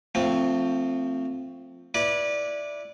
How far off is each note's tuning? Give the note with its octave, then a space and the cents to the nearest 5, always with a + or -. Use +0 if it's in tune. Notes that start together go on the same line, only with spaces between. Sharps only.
F3 +0 A3 +20 C4 +0
E4 +0 B4 -25 D5 +0